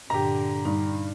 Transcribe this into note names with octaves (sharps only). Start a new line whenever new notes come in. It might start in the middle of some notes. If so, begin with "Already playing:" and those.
G2 A#2 D3 G4 A#5
G2 D#4